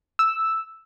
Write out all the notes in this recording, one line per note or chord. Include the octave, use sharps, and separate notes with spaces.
E6